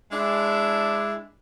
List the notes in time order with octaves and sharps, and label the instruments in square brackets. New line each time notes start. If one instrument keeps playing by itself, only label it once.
[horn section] G#3 D4 E4